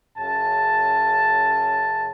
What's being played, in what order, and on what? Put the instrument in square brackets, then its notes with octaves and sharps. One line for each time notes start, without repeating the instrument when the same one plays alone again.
[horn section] F#2 C#3 A5